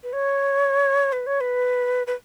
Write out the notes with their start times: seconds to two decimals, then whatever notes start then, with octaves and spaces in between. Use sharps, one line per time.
0.03 B4
0.13 C#5
1.12 B4
1.27 C#5
1.41 B4
2.07 B4